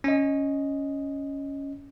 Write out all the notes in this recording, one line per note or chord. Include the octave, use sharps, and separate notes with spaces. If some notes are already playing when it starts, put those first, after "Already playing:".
C#4 D#5